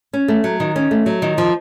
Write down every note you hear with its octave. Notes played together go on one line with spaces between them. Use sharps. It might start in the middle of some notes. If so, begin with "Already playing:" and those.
C#4
A3
F#3
D#3
C#4
A3
F#3
D#3
F3